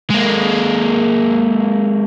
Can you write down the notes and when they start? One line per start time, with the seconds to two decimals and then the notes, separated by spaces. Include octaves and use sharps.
0.10 G#3 A#3